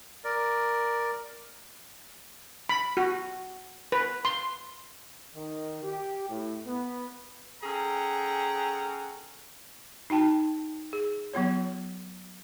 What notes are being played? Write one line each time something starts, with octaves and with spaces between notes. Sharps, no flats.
A#4 D5
B5
F#4
B4
C6
D#3
G4
A2
B3
C#4 G#4 A4 F#5 G5 A#5
D#4 F#4 G5 A5
G#4
F#3 B3 F4 C#5